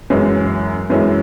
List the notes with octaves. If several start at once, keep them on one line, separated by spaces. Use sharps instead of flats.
F#2 E3 G#3 C#4 E4
F#2 E3 G#3 C#4 E4